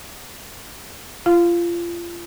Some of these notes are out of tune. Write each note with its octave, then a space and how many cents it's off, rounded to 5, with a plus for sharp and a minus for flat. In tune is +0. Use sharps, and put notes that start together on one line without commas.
F4 -30 F5 +0